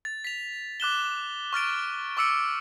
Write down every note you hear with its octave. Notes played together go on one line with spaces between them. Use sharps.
A6
B6 F7
D6 F#6 E7 G7
C#6 F6 A6 D7
C#6 D6 E6 C#7 D7